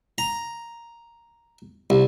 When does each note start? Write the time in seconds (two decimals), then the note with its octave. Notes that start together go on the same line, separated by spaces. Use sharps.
0.18 A#5
1.90 C2